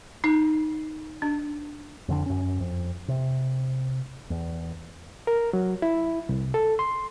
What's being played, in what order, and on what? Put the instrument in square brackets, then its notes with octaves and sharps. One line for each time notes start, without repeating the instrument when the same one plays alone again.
[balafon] D#4
D4
[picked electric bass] F2 D3 D4
F#2 C#4
F2
C3
E2
[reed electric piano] A#4
F#3
E4
C2
A4
C6